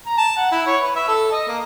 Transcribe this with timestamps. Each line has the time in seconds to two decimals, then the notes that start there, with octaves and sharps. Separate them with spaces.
0.06 A#5
0.18 A5
0.37 F#5
0.52 E4
0.67 C#5
0.82 B4
0.96 E5
1.08 A4
1.32 D#5
1.48 A#3